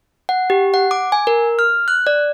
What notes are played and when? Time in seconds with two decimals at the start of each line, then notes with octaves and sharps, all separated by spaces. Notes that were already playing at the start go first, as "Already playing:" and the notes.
0.29 F#5
0.50 G4
0.74 F#5
0.91 D6
1.12 G#5
1.27 A#4
1.59 F6
1.88 F#6
2.07 D5